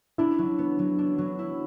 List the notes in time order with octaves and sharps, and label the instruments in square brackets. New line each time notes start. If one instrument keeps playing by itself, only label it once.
[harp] D4 [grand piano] E4
[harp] F#3
B3
F#3
D4
F#3
E4